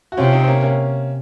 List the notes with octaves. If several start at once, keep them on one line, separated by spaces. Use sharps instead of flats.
F#4
C3 C#4 F4
C4 D#4
C4
A#3 C#4
A#3 C#4